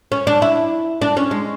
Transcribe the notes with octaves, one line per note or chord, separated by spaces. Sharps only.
C#4
D4
E4
D4
C#4
G#3